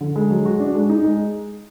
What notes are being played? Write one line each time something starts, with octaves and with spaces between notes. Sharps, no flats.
D3
G#3
F#3
F#4
D4
G#3
D#4
G#3